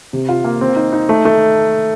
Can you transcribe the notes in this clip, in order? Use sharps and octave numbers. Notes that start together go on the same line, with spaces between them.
C3
F4
A#3
C4
D#4
D#4
A3
A3